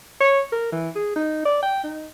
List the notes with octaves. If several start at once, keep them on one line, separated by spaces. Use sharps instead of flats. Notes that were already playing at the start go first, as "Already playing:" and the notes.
C#5
A#4
E3
G#4
D#4
D5
G5
D#4